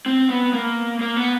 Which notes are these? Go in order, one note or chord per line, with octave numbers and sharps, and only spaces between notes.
C4
B3
A#3
A#3
B3